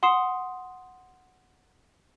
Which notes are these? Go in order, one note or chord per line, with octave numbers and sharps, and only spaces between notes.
F#5 C6 D#6 C7 E7